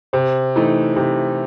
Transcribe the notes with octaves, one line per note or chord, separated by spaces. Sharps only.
C3 C5
E3 A3 D#4
C3